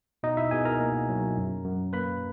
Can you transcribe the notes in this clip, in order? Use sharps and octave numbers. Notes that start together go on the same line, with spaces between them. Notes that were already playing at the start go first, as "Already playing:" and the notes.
B2 D#4 D#5
E4 E5
B2 G#4 G#5
A#4 A#5
A#3
F#3
F#2
F#2
A#3 B4 B5